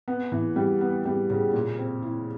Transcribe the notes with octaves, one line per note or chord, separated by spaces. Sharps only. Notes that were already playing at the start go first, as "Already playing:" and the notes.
B3
E3
G3
B3
G3
C#3
A#2
C4
E4